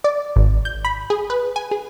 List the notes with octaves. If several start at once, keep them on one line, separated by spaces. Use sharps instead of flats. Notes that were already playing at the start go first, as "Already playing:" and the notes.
D5
G#1
G6
B5
G#4
B4
G#5
G#4